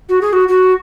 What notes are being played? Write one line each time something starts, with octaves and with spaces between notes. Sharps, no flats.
F#4
G#4
F#4
F#4